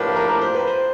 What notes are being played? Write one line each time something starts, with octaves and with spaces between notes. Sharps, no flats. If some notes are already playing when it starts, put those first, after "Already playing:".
Already playing: A2 F3 A#3 D4 G4 A#4 B4
A#4
A#4
C5
B4
C5